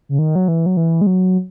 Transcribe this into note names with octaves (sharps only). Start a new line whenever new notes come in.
C#3
D#3
F#3
E3
F#3
E3
G#3
F#3